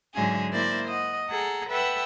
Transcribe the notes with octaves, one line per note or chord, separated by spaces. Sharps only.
G#2 D3 F#3 C#4 G#4 E5
A#3 E4 A#4 C5 D5 E5
D#5 F#5
G#4 A4 F#5 A#5
A4 B4 E5 F#5 G5 E6